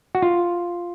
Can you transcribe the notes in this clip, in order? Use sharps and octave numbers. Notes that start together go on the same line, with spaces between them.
F#4
F4